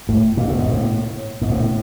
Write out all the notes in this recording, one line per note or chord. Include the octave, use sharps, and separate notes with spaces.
A2
A#2
A2
G#2
A2
G#2
A2